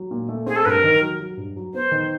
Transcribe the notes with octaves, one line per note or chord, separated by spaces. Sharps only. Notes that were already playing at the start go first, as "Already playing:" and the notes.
Already playing: F#3
A#2
A3
C4 G#4
A4
G2 A#4 B4
D#3
F#3
F#3
G2
F#3
B3 C5
D#3